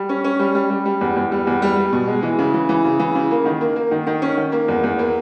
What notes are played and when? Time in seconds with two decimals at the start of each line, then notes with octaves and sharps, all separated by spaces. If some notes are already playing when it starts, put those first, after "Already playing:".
Already playing: G3
0.09 C#4
0.24 C#4
0.39 G3
0.55 G3
0.70 G3
0.86 G3
1.01 E2
1.16 E2
1.32 G3
1.47 E2
1.62 G3
1.77 G3
1.93 B2
2.07 G#3
2.23 E3
2.39 C#3
2.54 E3
2.69 E3
2.85 C#3
2.99 E3
3.15 C#3
3.31 A#3
3.46 D#3
3.61 A#3
3.76 A#3
3.91 D#3
4.07 D#3
4.22 C#4
4.37 D#3
4.52 A#3
4.68 E2
4.83 E2
4.99 A#3